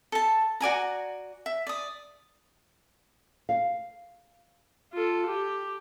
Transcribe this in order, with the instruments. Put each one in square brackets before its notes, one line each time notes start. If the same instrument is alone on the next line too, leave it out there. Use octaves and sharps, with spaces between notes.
[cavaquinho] A4 A5
F#4 D5 G#5 A#5
E5
D5 D#6
[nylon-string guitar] F5
[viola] F4 A4
G4